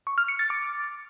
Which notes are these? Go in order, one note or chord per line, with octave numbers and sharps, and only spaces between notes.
C#6
F6
C#7
A6
D6